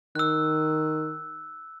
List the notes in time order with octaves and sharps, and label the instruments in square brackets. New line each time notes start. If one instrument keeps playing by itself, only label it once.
[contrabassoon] D#3 [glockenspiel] E6 F#6